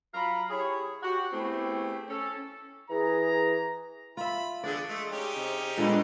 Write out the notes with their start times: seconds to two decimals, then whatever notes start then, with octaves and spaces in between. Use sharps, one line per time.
0.14 F#3 F4 F5 A#5 B5
0.50 E4 G4 G#4 C#5
1.03 F#4 G4
1.33 A3 B3 C4 E4 G4 G#4
2.09 C#4 A4
2.90 E3 G#4 A#5
4.17 F4 E5 B5
4.64 D3 A3 B3 D4 G#4 D5
4.88 G#3 A3
5.12 C#4 D#4 G4
5.36 C3
5.77 F#2 A#2 G#3 A3 B3 D4